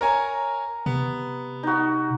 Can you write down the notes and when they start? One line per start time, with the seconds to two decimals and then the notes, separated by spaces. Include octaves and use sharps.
0.01 A#4 C#5 G#5 A#5
0.86 C3 B3
1.63 D#4 F#4